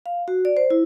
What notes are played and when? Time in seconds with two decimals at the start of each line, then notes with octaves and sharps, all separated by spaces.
0.06 F5
0.28 F#4
0.45 D5
0.57 C5
0.70 E4